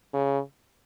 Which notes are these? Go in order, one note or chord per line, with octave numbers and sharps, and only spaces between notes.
C#3